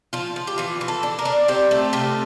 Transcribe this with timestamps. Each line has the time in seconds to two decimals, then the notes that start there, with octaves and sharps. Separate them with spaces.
0.13 F3 F4
0.36 F3
0.47 G4
0.58 E3 F4
0.81 E3
0.88 A4
1.03 D4
1.19 A#4
1.25 D4
1.48 C4 G4
1.71 A3
1.93 C3 F4